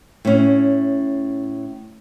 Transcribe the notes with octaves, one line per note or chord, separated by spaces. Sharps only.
A2 C#4